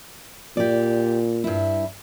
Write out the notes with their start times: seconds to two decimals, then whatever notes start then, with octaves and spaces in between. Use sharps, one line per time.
0.57 A#2 G4 D5
1.44 G2 E4